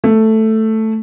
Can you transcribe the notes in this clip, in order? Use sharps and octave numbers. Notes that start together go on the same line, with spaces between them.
A3